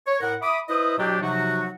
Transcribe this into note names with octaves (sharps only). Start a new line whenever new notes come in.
C#5
A2 A#4 F#5
E5 B5 D6 D#6
E4 B4 C5 D#5 E5 D#6
B2 F#3 D4 G4
C3 F3 F#3 D#4 F#4